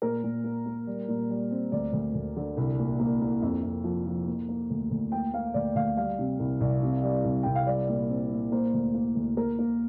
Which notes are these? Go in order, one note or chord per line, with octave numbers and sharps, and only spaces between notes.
A#2 A#4
A#2
A#3
A#3
G3
A#2
G3
C4
D2 D5
D2
D2
D3
C2
A#2
A#3
A#3
F2
F2
F3
F3
A#3
A#3
D2
D2
A#3 G5
A#3 F5
D2 D5
D2 F5
G3 F5
C3
C2
C2
C3
G3
C2
C2 G5
F5
G3 D5
A#2
C4
A#2
A#3 C5
D2
A#3
D2
A#3 A#4
A#3